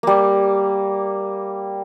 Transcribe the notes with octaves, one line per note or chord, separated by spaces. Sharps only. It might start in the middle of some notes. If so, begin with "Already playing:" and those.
G3 A#3